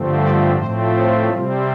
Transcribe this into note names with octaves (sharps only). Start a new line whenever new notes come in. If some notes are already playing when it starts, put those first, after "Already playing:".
Already playing: G2 D3 F3 A3 C4
D5
A2 F3 A3 C4 C5
A4
C3 G3 C4 F4